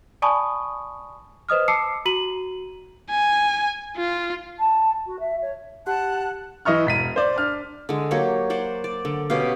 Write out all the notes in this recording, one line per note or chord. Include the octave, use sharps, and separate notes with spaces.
D5 G#5 A5 B5 C#6 D#6
B4 C5 D#5 D#6 F6
A5 D6 E6 C7 C#7
F#4 A#5 D#7 F#7
G#5
F4
A5
F#4
E5
C#5
G4 F#5 A5 F#6
E3 D#5 E5 C#6 F6
E1 B6 D#7
C5 D5
D4 F6
D3 G#3
F#3 A#3 G4 C#5
C5 D5 F#5
D5
D3
B2 C#4 G4 F5